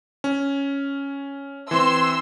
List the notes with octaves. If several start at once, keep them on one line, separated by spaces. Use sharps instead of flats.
C#4
E3 C4 C6 E6